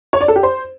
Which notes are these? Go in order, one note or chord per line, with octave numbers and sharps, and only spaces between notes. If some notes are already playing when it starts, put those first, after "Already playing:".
C#5
D5
A4
G4
C5